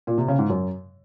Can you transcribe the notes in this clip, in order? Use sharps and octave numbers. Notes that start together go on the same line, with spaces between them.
A#2
C3
C#3
G#2
F#2